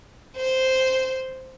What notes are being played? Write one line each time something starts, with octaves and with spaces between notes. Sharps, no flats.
C5